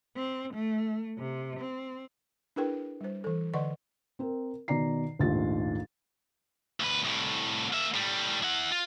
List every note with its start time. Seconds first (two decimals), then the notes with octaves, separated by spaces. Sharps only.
0.17 C4
0.54 A3
1.18 C3
1.61 C4
2.56 D4 E4 G#4 A#4 B4 G5
3.01 G3 C5
3.24 E3 A4
3.54 D3 D5 D#5 F#5 C6 C#6
4.19 C4 A#4
4.68 B2 D#3 D5 A#5 C7
5.19 A#1 D#2 G#2 A3 F4 A6
6.80 D2 B4
7.05 C2 A2
7.73 A#3 E5
7.94 A2 G3
8.43 E4 F#5
8.72 F4